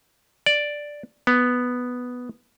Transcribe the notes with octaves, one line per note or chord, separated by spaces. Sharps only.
D5
B3